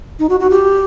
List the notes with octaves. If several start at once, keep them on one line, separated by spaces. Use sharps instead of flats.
D#4
F#4
F#4
G4